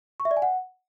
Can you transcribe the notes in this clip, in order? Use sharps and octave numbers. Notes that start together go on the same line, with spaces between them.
C#6
E5
D5
G#5
F#5